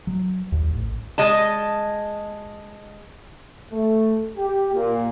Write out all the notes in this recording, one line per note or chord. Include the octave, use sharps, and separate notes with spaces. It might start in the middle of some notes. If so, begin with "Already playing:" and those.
F#3
D#2
A1
G#3 D#5 A5
A3
G4
A#2